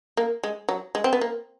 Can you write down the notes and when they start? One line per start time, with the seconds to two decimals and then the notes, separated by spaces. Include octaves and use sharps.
0.17 A#3
0.44 G#3
0.69 F#3
0.95 G#3
1.04 C4
1.13 B3
1.21 A#3